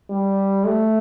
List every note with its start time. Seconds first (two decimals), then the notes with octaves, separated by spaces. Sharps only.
0.10 G3
0.64 A3